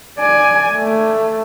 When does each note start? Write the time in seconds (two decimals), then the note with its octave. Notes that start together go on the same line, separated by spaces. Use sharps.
0.18 D5 G#5
0.74 A3